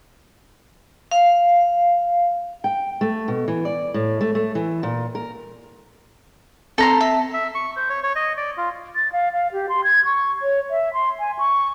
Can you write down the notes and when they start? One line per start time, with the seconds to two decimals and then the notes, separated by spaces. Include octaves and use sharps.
1.11 F5
2.64 G5
3.01 A3
3.28 B2
3.48 E3
3.65 D5
3.94 A2
4.21 A3
4.35 A3
4.55 E3
4.83 A#2
5.15 A#4
6.78 C4 A4 A5 A#5 C6 A#6
7.01 E5
7.34 E5
7.55 C#6
7.76 C5
7.90 C#5
8.03 C#5
8.15 D#5
8.37 D5
8.57 F4
8.96 A6
9.12 F5
9.33 F5
9.53 G4
9.69 C6
9.84 G#6
10.05 C#6
10.42 C#5
10.71 E5
10.93 C6
11.19 G#5
11.39 C#6